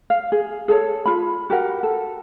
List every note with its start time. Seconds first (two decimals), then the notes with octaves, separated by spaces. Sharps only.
0.10 F5
0.32 G#4
0.68 G#4 A4 C#5
1.06 F4 B5
1.50 F#4 G4 A#4 F#5
1.83 A4